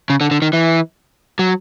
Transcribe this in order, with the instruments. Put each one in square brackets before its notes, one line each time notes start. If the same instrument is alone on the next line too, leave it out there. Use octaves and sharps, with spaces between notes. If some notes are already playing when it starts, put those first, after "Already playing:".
[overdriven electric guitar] C#3
D3
D3
D#3
E3
F#3